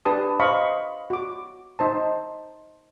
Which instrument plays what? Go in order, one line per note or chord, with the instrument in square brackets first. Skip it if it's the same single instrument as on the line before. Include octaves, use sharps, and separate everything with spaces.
[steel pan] D4 G4 B4 A5 D#6
C5 D#5 F5 B5 C#6
F#4 D6
D#4 C5 A5